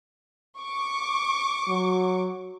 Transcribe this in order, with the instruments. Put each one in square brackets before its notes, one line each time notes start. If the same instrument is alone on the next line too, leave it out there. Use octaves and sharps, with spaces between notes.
[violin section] C#6 D6
[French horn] F#3